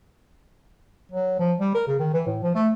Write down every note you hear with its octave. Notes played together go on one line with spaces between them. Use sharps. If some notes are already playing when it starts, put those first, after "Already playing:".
F#3
F3
G3
A#4
C#3
D#3
E3
A2
F3
A3